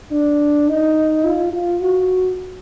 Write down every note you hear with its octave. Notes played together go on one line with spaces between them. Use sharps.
D4
D#4
F4
F4
F#4